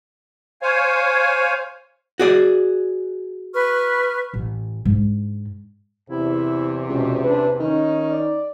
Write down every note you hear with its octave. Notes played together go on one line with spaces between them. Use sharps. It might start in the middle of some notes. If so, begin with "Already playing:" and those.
C5 C#5 F5 G#5
F#4 G#4 D5
B4 C#6 F6
A1
G#2 D4
E2 C3 E4
C#2 B2
D4 B4
D#3 C#4 D#4
D5